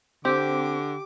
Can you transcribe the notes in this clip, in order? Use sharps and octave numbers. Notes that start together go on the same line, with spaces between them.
D3 C4 G4 D6